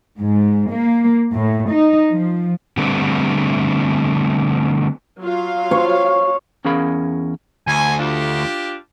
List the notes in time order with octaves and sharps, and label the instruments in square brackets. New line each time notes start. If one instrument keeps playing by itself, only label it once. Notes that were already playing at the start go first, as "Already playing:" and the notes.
[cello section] G#2
A#3
A2
D#4
F3
[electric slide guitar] D3 G3 A3 B3 C4 D4
[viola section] F#3 F4 F5
[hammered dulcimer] C#5
[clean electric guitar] E2 C#4 G#4 A#4 F5 B5
[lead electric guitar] D2 [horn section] G#5
[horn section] D4 F4 G4